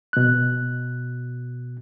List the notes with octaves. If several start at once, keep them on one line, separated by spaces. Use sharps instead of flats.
B2 F#6